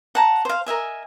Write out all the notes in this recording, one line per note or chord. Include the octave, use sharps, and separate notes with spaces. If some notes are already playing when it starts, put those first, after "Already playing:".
F#5 A5 A#5
C5 F5
A#4 D#5 E5 G#5